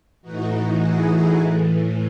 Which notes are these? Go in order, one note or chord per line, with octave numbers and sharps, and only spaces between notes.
A2 E3 D#4 F#4
E4 G#4
A2 E3